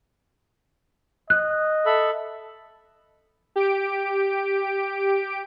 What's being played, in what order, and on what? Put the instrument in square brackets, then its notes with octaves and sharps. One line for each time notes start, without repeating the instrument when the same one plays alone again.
[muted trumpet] D#5 [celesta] F#6
[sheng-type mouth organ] A4 E5 B5
[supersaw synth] G4 D7